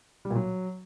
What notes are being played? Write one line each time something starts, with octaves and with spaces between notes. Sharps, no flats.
G3
A#2
F#3